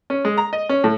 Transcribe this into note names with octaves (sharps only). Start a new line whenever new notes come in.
C#4
G#3
A#5
D#5
C#4
A2